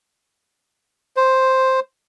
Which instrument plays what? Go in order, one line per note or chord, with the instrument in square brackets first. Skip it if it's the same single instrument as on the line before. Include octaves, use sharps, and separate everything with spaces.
[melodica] C5